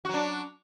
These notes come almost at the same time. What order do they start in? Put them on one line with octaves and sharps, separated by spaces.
F#4 F#3 D4